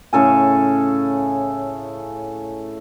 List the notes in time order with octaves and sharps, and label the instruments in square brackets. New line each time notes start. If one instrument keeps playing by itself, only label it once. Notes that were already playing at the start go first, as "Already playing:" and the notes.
[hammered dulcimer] A2 C#3 A4 G#5